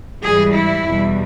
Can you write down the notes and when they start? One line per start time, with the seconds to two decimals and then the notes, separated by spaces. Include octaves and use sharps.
0.22 G#2 E3 G3 G#4
0.53 E4
0.85 E2 B2 G3